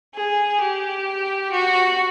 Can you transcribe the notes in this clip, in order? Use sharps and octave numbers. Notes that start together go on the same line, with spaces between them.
G#4
G4
F#4